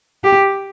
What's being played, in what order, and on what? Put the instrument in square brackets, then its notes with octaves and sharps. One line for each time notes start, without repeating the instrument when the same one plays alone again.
[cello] G4